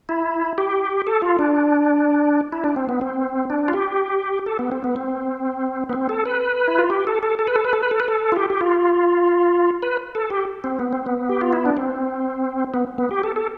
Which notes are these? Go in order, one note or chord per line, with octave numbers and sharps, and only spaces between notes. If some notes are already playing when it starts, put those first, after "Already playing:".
E4
G4
A4
F4
D4
E4
D4
C4
B3
C4
D4
F4
G4
A4
B3
C4
B3
C4
B3
C4
A4
B4
E4
F4
G4
A4
A4
A4
B4
A4
B4
A4
B4
A4
B4
A4
F4
G4
G4
F4
B4
A4
G4
C4
B3
C4
B3
G4
F4
E4
D4
C4
B3
B3
G4
A4
A4